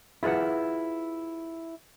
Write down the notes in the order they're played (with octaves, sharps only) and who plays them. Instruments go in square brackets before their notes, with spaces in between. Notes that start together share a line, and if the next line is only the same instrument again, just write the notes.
[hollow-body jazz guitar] E4 F4 G#4 B4 F#5